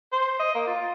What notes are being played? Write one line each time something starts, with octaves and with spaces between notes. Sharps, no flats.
C5
D#5
A#3
F4